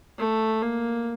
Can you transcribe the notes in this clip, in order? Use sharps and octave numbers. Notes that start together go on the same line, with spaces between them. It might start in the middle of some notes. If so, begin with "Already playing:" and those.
A3
A#3